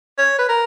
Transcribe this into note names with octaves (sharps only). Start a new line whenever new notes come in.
C#5
B4
A#4